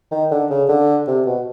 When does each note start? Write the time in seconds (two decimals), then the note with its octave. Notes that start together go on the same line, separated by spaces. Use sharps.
0.11 D#3
0.31 D3
0.50 C#3
0.69 D3
1.07 C3
1.26 B2